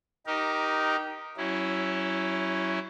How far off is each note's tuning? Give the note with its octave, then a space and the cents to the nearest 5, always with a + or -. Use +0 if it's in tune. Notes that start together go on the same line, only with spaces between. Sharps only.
D#4 +0 G4 -15 A#4 +15
F#3 +30 C#4 +0 E4 +0